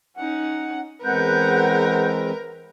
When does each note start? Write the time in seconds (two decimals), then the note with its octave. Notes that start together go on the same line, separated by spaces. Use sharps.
0.17 C#4 D#4 F#5
1.04 E2 G#3 C4 A#4 B4 F#5 F#6 G6